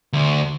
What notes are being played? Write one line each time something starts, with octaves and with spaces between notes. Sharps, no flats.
D2